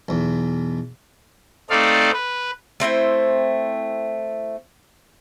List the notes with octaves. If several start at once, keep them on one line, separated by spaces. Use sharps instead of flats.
B1 E2
A3 C4 D#4 A4 D5 F5
B4
A3 C4 E4 C5